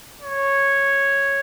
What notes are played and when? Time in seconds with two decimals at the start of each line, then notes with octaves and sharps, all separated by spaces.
0.22 C#5